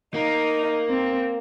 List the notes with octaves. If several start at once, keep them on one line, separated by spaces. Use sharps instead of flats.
A#3 D#4
C4